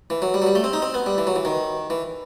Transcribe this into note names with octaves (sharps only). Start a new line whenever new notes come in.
E3
F#3
G3
F#3
G3
A3
C4
D#4
C4
B3
G3
E3
F#3
E3
D#3
E3